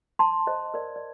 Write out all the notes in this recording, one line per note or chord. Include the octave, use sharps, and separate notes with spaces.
A5 C6
C5 D#5
A#4 D5
D5